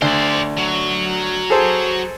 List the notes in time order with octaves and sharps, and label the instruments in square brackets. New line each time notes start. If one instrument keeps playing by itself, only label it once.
[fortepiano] D2 [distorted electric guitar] C5 D5
[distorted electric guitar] F#3
[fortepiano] G#4 A4 C5